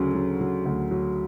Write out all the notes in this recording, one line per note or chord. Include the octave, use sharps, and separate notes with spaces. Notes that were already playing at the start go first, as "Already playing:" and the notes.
Already playing: D2 C#3 F#3
F#3
F#3
D2
F#3